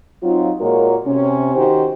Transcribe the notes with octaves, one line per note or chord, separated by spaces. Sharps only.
F#3 C4 D#4 F4
A#2 G#3 F4 F#4 A#4 C#5
C3 C#4
D#3 D#4 F#4 G4 C5